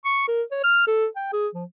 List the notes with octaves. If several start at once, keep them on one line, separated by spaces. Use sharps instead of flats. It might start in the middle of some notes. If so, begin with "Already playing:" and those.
C#6
A#4
C#5
F6
A4
G5
G#4
F3